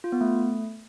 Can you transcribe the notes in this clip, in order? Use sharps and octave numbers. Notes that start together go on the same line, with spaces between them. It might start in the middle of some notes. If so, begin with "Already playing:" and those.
F4
B3
A3